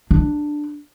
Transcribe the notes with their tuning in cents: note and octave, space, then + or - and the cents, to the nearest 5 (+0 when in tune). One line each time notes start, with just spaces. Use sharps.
D4 +10